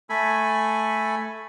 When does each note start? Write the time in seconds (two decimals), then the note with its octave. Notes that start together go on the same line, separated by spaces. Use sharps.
0.09 A3 A4 G#5 B5